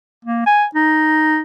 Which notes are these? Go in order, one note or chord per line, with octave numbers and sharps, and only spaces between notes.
A#3
G#5
D#4